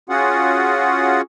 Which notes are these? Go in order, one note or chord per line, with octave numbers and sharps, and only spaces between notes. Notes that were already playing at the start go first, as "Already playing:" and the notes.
C#4 F4 F#4 G#4 F#5